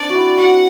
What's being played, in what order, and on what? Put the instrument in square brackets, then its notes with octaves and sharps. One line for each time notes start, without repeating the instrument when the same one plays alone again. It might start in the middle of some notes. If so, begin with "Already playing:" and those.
Already playing: [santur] C4 D4 [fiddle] D5
[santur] F#4
E4
[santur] F#4 [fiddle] F#5